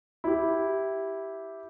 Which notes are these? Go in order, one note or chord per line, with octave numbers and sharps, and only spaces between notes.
E4 G4